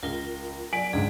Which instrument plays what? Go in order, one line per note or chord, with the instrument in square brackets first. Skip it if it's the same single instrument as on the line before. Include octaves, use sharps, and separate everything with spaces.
[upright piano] C#2 G7 [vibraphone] F4 A#4
[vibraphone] F#3 D5 [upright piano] G#5 D7 F#7
[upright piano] C#2 G#2 D3 [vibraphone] G#4